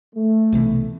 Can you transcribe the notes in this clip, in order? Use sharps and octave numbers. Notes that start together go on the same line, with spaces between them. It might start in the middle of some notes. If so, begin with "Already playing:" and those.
A3
B1 C3 E3